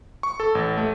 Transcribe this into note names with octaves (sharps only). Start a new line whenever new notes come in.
C#6
A4
A1
A3